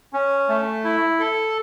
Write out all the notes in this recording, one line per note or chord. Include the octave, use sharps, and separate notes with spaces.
C#4
A3
E4
A4